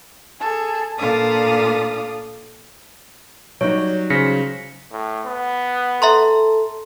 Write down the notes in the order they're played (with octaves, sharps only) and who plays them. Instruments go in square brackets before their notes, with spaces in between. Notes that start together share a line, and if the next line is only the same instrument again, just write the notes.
[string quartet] G#4 A4
A#2 D4 A4 D5 F5 D#6
[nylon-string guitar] F#3 G3 D#4 [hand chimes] C#5
[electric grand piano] C#3 C5 [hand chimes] A#6 B6 C#7
[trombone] A2
B3
[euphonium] A4 [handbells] E5 A#5 C6